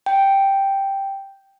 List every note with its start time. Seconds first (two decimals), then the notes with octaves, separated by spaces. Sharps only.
0.06 G5